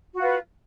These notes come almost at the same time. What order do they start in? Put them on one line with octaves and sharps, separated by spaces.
F#4 F4 B4